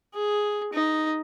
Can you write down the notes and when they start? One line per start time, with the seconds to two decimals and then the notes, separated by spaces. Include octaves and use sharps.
0.14 G#4
0.73 D#4